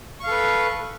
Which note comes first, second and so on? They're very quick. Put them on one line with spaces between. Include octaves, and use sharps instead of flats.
C#6 F5 A4 B4